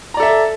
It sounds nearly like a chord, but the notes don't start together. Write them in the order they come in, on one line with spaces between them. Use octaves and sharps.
A#5 D5 A4 E5